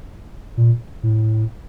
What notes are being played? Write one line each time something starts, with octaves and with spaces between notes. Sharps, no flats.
A#2
A2